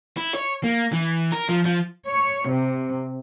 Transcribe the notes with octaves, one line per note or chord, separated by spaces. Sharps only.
E4
C#5
A#3
E3
A#4
F3
F3
C#5
C3